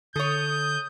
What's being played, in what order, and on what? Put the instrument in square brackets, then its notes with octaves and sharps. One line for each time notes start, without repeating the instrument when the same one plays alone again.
[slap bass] D3 [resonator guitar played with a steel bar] A4 C#5 [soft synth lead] D#6 [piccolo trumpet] G6